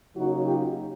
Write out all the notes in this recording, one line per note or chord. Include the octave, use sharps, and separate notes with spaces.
C#3 F#3 A#3 D#4 E4 F#4
F4 G4